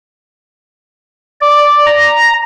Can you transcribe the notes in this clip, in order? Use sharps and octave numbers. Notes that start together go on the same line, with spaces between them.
D5
A#5